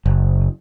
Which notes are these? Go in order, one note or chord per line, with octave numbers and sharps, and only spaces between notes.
F#1